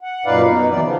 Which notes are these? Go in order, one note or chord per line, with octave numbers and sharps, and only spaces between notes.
F#5
F#2 A#2 D#4 B4 D5 F5
B2 D#4
D#2 E3 F#3 B3 D5
C#3 F3